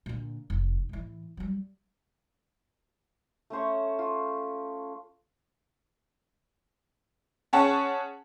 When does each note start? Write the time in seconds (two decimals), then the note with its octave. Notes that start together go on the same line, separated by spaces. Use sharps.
0.06 A#2 D3
0.50 F1
0.89 A2 E3
1.37 F#3 G3
3.50 A3 C#4 C5 C#5
3.99 F4
7.53 C#4 G#4 C#5 F#5 A5